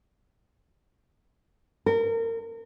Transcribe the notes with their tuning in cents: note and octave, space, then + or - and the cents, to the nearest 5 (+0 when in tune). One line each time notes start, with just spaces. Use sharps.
A#4 -30